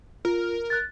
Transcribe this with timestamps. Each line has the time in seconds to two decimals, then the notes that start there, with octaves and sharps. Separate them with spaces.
0.25 F4 A#4
0.70 F#6 A6